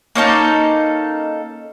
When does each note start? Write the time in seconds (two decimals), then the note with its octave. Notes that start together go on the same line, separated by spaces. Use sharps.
0.15 A#3 C#4 D#4 A4